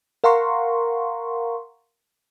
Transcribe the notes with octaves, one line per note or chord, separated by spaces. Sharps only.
A#4 F5 F#5 A#5 C6 C#6